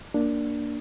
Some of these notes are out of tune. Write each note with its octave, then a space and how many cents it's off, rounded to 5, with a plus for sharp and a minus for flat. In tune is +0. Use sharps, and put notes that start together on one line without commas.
A#3 +0 D4 +0